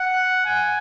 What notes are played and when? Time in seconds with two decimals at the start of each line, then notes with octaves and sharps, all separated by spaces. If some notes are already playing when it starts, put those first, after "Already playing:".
Already playing: F#5
0.46 G#5